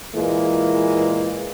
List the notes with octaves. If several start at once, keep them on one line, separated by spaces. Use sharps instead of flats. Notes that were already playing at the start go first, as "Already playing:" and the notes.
A#2 E3 G#3 A#3